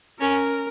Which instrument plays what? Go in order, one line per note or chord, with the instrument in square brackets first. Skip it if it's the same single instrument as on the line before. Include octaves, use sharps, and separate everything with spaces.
[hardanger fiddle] C#4 [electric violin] A#4